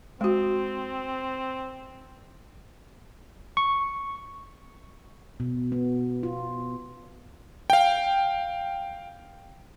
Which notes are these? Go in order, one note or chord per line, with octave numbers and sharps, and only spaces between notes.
G#3 C4 F#4
C#6
B2
B3
F4
F5 G5